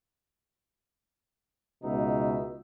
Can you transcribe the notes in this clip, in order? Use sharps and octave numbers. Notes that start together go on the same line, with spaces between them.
C#2 B2 D#4 E5